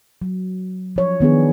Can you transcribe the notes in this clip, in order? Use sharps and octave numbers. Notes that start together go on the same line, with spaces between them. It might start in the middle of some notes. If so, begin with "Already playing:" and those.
F#3
F3 C#5
D#3 B3 D4 G#4